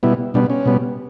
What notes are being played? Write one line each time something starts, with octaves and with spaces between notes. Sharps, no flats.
B2 G3 B3 E4
B2 G3 B3 D4
C#4
B2 G3 B3